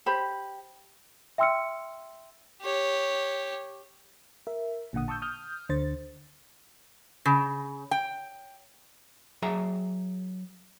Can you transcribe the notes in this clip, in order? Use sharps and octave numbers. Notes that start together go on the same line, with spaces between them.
G4 C5 B5
E5 G5 C6 E6 F6 C#7
G4 C#5
A#4 E5
A1 A#2 D3 F#5 D#6
A5 C#6 D#6 E6 G6
D#6 F6 G6
D2 D3 C5 A6
C#3
G5
F#3 G#4 E5 A#5